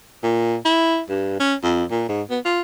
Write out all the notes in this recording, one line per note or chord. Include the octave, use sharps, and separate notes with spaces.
A#2
E4
G2
C#4
F2
A#2
G#2
B3
F4